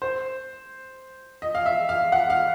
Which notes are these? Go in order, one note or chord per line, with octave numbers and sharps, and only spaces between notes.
C5
D#5
F5
E5
F5
F#5
F5